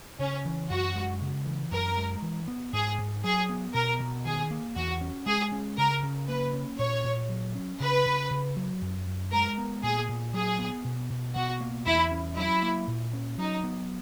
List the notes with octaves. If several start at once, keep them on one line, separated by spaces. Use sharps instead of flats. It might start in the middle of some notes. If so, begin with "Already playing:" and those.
C#3 C#4
E3
F#2 F#4
G#3
C#3
E3
F#2 A#4
G#3
E3
B3
G#2 G#4
G#2
F#3 G#4
B3
B2 A#4
B2
D#3 G#4
A#3
E2 F#4
C#4
G#3 G#4
C#4
C#3 A#4
C#3
A#3 B4
C#4
A#2 C#5
A#2
F#3
C#4
C#3 B4
C#3
C#3
F#3
F#2
F#2
G#3 A#4
B3
A#2 G#4
A#2
F#3 G#4
B3
B2
B2
B2 F#4
A#3
E2 E4
C#4
F#3 E4
A#3
A#2
C#4
F#3 D#4
B3